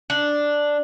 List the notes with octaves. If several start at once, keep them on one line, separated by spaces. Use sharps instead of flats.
D4